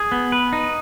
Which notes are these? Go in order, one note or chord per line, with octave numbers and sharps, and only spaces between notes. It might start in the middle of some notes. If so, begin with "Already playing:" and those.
Already playing: G#4
B3
B4
D#4